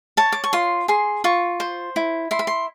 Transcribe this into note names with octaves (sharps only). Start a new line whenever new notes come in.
C#5 A5
D6
C#6
F4 C6
G#4 C6
F4 C#6
C5
E4
E4 C6
B5
C6